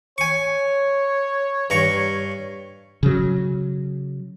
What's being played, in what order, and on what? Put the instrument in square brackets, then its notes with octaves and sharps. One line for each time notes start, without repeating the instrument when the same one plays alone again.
[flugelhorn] C#5 [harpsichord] G#5 C#6
[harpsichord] G2 A#5 C#6
[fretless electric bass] C#3 F#3